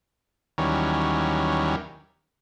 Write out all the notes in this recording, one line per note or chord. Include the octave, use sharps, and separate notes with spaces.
D#2 D#3 E3 F#3 G3 C#4